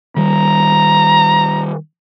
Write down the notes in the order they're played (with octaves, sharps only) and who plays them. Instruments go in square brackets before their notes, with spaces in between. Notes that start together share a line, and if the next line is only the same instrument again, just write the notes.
[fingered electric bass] D#3 G3 [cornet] A#5